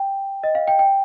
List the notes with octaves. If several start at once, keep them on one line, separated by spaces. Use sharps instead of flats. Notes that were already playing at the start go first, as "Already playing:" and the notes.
Already playing: G5
D#5
F5
G5
G5